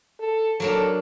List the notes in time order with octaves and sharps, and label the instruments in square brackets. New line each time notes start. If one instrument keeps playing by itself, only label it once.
[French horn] A4
[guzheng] F#3 A#3 D4 [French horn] A4